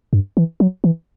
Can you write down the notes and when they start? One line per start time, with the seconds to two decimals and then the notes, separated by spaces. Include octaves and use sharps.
0.13 G2
0.37 E3
0.60 F#3
0.84 E3